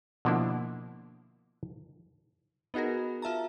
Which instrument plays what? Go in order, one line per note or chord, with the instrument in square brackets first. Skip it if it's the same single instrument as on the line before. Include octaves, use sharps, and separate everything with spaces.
[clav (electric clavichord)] B2 D3 F3 A#3 D4 E4
[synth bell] B3 D#4 F#4 G#4 A#4
F4 E5 A5 A#5